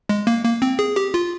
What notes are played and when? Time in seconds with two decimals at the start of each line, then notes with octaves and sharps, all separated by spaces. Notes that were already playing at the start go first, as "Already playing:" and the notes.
0.09 G#3
0.27 A#3
0.44 A#3
0.62 C4
0.79 G#4
0.96 G4
1.14 F4